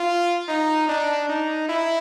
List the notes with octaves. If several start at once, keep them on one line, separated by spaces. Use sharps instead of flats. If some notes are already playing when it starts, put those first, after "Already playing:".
Already playing: F4
D#4
D4
D#4
E4